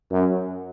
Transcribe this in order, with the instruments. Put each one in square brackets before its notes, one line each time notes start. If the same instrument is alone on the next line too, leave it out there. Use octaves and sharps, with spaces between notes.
[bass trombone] F#2